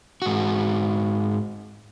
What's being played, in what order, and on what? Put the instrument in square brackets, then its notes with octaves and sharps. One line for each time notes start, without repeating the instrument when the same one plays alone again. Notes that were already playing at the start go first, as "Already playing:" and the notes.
[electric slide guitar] G#2 F#4